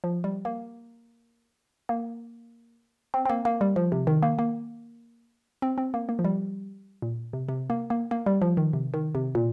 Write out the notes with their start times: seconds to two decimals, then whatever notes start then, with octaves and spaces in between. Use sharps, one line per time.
0.04 F3
0.24 G3
0.45 A#3
1.89 A#3
3.14 C4
3.26 C4
3.29 A#3
3.45 A#3
3.61 G3
3.76 F3
3.92 C3
4.07 D#3
4.23 A#3
4.39 A#3
5.62 C4
5.78 C4
5.94 A#3
6.09 A#3
6.19 F3
6.24 G3
7.02 A#2
7.33 C3
7.49 C3
7.70 A#3
7.90 A#3
8.11 A#3
8.26 G3
8.42 F3
8.57 D#3
8.73 C3
8.94 D#3
9.15 C3
9.35 A#2